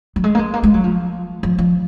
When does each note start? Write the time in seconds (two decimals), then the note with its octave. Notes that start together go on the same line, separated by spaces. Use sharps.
0.16 F#3
0.24 G#3
0.35 A#3
0.39 G#3
0.54 A#3
0.63 G#3
0.74 F#3
0.84 F3
1.43 F3
1.58 F3